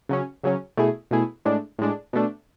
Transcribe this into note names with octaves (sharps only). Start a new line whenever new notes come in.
C#3 F#3 C#4
C#3 F#3 C#4
B2 A3 E4 G#4
B2 A3 E4 G#4
A2 G#3 D4
A2 G#3 D4
B2 A3 D4